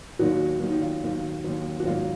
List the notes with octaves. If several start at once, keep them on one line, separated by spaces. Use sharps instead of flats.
D#2 D#3 F#3 D#4 F#4
D#2 D#3 F#3
D#4
F4
D#2 D#3 F#3
D#2 D#3 F#3
F#4
G#2 D#3 F#3 F4